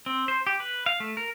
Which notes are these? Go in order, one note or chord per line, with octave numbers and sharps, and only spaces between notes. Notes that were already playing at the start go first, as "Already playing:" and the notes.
C4
C5
G4
B4
F5
A3
A#4